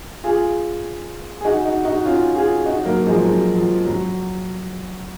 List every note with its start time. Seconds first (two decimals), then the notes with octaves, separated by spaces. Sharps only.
0.24 F4 G#4
1.41 G#4
1.45 D#4 F#4
1.65 D#4 F#4
1.85 D#4 F#4
1.96 F#4
2.05 C#4 F4
2.35 F4 G#4
2.65 D#4 F#4
2.85 F#3 A#3
3.06 F3 G#3
3.25 F#3
3.55 F3
3.86 F#3